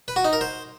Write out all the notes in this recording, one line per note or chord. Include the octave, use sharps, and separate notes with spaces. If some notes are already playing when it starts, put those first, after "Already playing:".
B4
F#4
D#4
A#4
C5